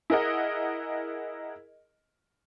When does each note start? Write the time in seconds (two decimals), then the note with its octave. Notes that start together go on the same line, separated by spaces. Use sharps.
0.10 E4 G#4 A#4 D#5 F#5